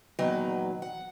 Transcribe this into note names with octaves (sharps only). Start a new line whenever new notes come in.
E2 A#2 D#3 F#3 B4
F#5